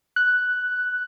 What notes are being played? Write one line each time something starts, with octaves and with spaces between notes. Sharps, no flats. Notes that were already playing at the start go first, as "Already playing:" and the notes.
F#6